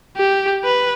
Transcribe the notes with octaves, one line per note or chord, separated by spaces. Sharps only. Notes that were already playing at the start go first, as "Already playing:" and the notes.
G4
B4